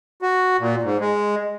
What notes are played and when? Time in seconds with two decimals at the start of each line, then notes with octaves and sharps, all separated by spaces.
0.22 F#4
0.59 A#2
0.83 G#2
1.00 G#3